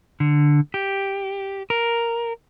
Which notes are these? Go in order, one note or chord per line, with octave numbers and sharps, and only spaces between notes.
D3
G4
A#4